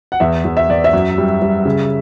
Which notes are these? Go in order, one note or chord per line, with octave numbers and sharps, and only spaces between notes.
F#5
E2 E5
E2
E5
E2 D5
E5
F#2
G3
G3
C#3